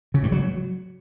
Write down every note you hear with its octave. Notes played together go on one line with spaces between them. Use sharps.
C#3
G2
F#3